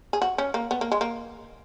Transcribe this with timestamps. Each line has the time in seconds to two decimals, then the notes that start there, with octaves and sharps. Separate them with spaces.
0.13 G#4
0.22 F#4
0.38 C#4
0.54 A#3
0.71 B3
0.81 A#3
0.92 G#3
1.01 A#3